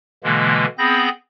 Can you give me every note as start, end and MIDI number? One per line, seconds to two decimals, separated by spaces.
0.24 0.65 47
0.24 0.65 50
0.24 0.65 52
0.24 0.65 56
0.24 0.65 58
0.78 1.09 59
0.78 1.09 60
0.78 1.09 68
0.78 1.09 83
0.78 1.09 91
0.78 1.09 94